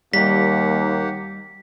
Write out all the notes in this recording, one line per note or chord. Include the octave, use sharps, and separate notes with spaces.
D#2 G3 A#3 G4 F#5 B6